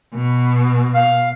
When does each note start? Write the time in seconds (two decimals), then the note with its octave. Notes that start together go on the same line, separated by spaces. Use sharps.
0.14 B2
0.95 F5 F6